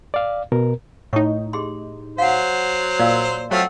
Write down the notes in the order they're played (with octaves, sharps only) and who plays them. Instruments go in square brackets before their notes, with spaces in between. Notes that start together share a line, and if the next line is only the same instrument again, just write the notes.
[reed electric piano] D5 F5
B2 A#4
[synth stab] A2 D#4 [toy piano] C#6
[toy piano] G4 G#4 C6
[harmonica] F#3 C5 [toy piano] F5 F#5
[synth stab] A#2 [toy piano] D5 F5 E6
[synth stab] F#3 [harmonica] A3 C4 F4 [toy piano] A4 F#5 E6